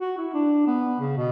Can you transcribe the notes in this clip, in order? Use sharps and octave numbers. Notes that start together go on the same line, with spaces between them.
F#4
E4
D4
B3
C#3
B2